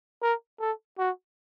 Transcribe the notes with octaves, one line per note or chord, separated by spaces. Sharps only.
A#4
A4
F#4